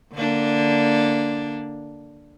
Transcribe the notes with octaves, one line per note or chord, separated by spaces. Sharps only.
D3 A#3 D4